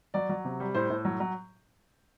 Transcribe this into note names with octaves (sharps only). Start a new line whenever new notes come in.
F#3 D5
F#3
C3
G3
A2 C5
A2
F#3
F#3